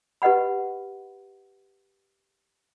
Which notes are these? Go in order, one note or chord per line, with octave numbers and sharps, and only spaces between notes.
G4 B4 D#5 F#5 B5